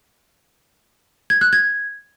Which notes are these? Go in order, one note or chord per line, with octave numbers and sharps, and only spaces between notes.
G#6
F#6
G#6